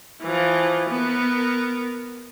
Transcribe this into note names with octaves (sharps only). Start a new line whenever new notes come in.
E3 F3
B3 A#4